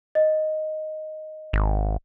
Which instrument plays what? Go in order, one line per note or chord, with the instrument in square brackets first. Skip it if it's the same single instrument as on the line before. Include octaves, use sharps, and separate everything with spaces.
[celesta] D#5
[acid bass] G#1